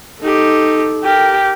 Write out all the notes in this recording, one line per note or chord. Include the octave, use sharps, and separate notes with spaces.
D#4 G4 A4
G4 A#4